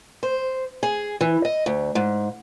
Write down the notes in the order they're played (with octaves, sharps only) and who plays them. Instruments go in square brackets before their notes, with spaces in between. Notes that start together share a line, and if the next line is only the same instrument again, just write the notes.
[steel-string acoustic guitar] C5
G#4
E3
D#5
D2
G#2